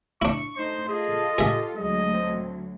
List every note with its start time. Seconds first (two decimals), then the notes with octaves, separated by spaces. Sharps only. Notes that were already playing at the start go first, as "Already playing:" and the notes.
0.22 D4 E4 C#6
0.57 A3 D#4 C5
0.89 F4 G#4 A4 D#5
1.38 G4 G#4 E5
1.77 D2 F#3 G#3 D#5
2.13 C4